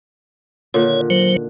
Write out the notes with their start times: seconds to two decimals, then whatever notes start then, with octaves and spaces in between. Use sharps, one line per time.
0.74 A#2 D3 D#3 C#5
1.10 F#3 C5